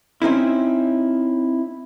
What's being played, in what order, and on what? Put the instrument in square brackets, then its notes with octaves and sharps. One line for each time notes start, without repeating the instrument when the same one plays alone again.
[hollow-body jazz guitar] C4 C#4 D#4 E4